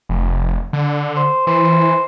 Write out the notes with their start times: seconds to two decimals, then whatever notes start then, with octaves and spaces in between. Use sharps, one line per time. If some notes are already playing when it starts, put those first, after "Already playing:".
0.09 F1
0.73 D3
1.16 C5
1.47 E3 C5